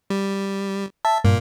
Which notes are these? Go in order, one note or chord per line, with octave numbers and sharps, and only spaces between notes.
G3
E5 A5
G2 A#2 A#3